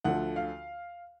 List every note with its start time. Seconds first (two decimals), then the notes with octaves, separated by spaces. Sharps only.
0.04 D2 D3 F3 F#5
0.36 F5